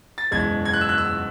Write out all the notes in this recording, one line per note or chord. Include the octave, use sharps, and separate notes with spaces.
A6
F#1 E2 B2 G#3 G#6
G#6
F#6
E6
F#6
E6